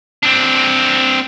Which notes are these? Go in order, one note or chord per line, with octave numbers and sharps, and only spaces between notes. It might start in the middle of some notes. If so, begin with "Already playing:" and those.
C4 D4